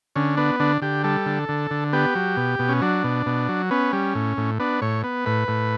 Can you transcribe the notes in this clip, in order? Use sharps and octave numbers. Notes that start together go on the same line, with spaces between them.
D3 C#4
B3 D4
D3 D4
D3 G4
G3 A4
D3
D3
D3
B3 G4
F#3
B2
B2
C#4
F#3 D4
B2
B2
F#3
B3 C#4
G3
A2
A2
B3 D4
A2 C#5
B3
A2 B4
A2